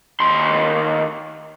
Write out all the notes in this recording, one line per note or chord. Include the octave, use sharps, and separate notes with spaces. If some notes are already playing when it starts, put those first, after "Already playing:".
D#2 C6